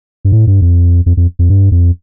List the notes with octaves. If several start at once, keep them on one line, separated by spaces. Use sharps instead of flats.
G2
A2
G2
F2
F2
F2
F2
G2
F2